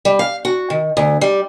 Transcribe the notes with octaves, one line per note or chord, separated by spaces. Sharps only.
G3
F5
F#4
D#3
D2
G3